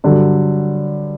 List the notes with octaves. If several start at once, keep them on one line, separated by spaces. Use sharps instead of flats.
G2 D3 F#3